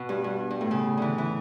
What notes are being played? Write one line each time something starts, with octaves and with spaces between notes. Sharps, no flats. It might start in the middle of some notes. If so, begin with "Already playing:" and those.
Already playing: B2 B3
G2
G2
G2
A2
C#3
D3 E3
E3